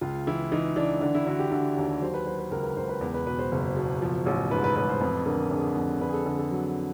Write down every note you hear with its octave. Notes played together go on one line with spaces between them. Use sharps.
C#2 F4
E3 E4
E3 D#4
E3 D4
D3 D4
E4
D3 F#4
G4
D3
D#2
F#3 C5
B4
F#3 C5
B4
C#2 A#4
B4
C#2 C5
B4
E2
B4
B2 B4
C5
F#1
B2
F3
A1
G#2 B4
B4
A1 B4
C5
F2 B4
D3 A#4
D3 G#4
F2
D3 B4
G#4
A4
D3 G#4
A4
F#3